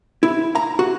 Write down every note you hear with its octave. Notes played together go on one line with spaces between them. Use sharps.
E4
A#5
F#4